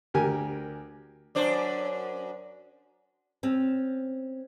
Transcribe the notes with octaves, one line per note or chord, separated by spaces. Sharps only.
D2 G4 A#4 G#5
F#2 D4 C5
C4 C#4